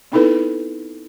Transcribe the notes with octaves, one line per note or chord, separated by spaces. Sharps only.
B3 C4 D#4 E4 A4 B4